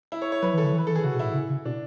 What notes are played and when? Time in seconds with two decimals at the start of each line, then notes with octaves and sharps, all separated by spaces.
0.12 E4
0.22 C#5
0.32 C#5
0.42 F#3 B4
0.53 E3
0.58 A4
0.63 D3
0.72 E3
0.78 B4
0.87 E3 A4
0.95 G#4
1.04 C#3 F#4
1.14 B2
1.19 E4
1.24 A2
1.34 C#3
1.49 C#3
1.65 B2 D4